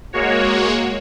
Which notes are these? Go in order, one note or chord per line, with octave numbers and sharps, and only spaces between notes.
G#3 A#3 F#4 C#5